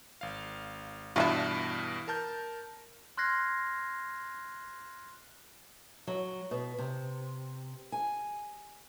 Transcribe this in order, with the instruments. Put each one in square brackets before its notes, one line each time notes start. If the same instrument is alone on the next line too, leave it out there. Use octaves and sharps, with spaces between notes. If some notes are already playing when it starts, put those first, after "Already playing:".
[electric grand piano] G#1 F5
[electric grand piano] G2 B2 E3 [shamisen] D4 E4 F4
[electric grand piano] A#4 A5 G6
[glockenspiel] C6 F6 F#6 G#6 A#6 C7
[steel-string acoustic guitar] F#3
B2
C3
G#5